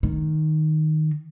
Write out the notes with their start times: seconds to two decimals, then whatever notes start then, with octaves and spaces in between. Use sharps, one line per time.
0.03 D#3